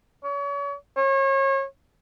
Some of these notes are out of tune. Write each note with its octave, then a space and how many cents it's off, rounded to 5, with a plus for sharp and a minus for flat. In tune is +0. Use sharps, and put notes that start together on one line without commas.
C#5 +35
C#5 -35